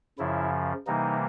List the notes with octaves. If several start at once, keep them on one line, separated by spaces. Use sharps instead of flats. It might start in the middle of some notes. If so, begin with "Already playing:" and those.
F#2 C#3 F3 E4
C3 E3 G3 A#3 D#4